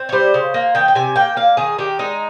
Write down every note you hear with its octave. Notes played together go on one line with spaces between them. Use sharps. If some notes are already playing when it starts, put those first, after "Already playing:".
Already playing: C4
C#5
G3 C5
C#3
A#3
D#3 G5
G5
C3 G#5
A#3 G5
A#3 F5
D#3 G#4
D#3 G4
G#3 D#4